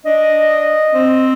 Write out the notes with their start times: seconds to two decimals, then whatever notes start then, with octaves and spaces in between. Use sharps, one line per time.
0.05 D4 D#5
0.93 C4